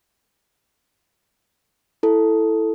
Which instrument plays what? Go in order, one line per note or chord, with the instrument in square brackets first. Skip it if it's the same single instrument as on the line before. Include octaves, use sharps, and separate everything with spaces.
[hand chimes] E4 A4